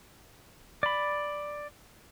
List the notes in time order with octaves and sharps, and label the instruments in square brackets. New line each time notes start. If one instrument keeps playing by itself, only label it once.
[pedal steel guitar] D5 B5